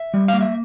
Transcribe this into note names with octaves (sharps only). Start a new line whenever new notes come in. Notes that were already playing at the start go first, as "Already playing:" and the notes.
Already playing: E5
G3
A#3 F5
E5